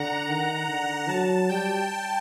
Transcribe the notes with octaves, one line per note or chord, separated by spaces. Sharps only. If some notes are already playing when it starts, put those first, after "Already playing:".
Already playing: D3 F#5 A#5
D#3
D3
F#3 A5
G3 G5